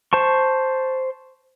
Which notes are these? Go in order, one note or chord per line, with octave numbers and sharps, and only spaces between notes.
C5 A5 C#6